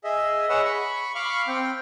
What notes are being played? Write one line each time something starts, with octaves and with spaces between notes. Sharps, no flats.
G#4 D#5 E5
G#4 B4 C#5 D#5 F#5 E6
B5 C#6
F5 B5 C#6 D6 F6
C4 G5